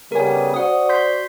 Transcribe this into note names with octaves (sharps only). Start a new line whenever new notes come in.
C#3 G3 B3 A#4 G#5
F#4 C5 D5 F#5 D#6
C6 G6 B6